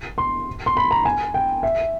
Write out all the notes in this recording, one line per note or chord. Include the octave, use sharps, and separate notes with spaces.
C6
C6
B5
A#5
G#5
G5
E5